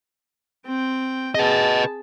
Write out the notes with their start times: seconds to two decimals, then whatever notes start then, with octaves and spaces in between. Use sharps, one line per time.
0.66 C4 G5
1.35 G#4 B4 D#5 A5